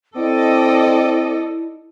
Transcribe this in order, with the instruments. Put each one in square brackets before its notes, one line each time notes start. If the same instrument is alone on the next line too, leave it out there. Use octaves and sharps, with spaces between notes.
[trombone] C4 [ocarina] E4 [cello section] A4 D5 D#5